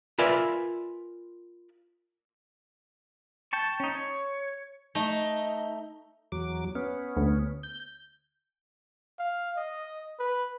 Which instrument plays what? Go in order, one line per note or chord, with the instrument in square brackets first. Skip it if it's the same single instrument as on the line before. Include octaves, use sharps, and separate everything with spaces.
[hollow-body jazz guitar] F4 A#4 B4 D5 E5 G#5
[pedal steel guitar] G5 A5 C#6
C#4 D#4
C#5
[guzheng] A3 D#4
[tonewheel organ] E2 F#3 D6
B3 C#4
[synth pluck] D2
[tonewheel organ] G6
[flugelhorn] F5
D#5
B4